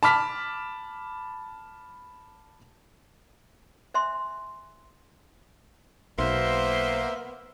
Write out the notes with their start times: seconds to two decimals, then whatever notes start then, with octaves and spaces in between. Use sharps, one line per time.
0.03 A5 B5 D6 F6 B6
3.94 C5 E5 G#5 C6
6.18 B1 A#3 B3 C5 E5 C6